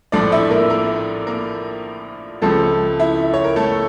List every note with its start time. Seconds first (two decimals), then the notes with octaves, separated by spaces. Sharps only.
0.12 A#1 A2 F3 A3 D4 D5
0.32 E4 E5
0.50 A#3 A#4
0.70 A#3 A#4
1.27 A#3 A#4
2.42 C#2 C#3 F3 A3 A4
2.99 E4 E5
3.34 C#5
3.44 A#4
3.56 A3 A4